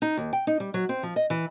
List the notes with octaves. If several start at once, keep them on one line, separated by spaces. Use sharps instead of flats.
D#4
D#2
G5
D#4
G3
F#3
C4
F3
D#5
E3